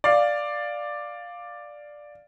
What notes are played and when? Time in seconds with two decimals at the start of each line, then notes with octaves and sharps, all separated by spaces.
0.04 D5 F5